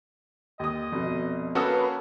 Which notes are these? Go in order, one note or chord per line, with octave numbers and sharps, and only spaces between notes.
D#2 D#5 D#6
F1 B2
A#3 C#4 F#4 A4 B4 D#6 E6